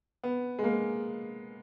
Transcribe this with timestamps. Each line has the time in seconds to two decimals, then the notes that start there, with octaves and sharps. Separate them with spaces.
0.24 B3
0.59 G#3
0.64 A#3